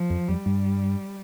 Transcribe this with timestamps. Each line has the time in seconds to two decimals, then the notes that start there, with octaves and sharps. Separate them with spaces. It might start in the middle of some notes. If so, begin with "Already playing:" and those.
Already playing: F3
0.10 F2
0.28 F2 G3
0.46 G2